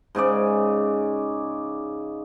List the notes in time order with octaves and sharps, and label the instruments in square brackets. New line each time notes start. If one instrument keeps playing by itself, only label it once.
[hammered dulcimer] G#2 C#3 G#4 D5